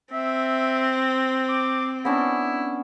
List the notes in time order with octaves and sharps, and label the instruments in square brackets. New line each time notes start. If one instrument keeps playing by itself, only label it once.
[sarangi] C4 [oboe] E5
[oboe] D6
[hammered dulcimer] B3 C#4 D4 [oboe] E4